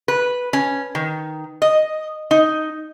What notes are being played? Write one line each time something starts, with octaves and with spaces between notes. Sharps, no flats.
B4
C#4
D#3
D#5
D#4